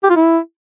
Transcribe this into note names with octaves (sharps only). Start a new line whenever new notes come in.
G4
F4
E4